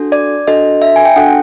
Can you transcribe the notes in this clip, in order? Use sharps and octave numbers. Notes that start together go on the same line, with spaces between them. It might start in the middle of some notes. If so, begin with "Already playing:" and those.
Already playing: D4 F#4 A4
D5
D4 F#4 A4 D#5
E5
G#5
G5
D4 F#4 A4 F#5